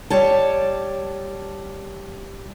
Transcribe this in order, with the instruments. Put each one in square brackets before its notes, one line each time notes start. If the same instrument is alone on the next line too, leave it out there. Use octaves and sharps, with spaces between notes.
[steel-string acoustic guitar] G3 C#5 A5